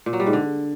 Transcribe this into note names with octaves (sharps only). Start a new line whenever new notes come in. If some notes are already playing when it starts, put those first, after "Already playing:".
A#2
F#3
G3
G#2
D3